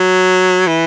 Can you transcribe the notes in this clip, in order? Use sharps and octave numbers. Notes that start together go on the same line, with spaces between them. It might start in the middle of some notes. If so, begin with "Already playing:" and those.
Already playing: F#3
E3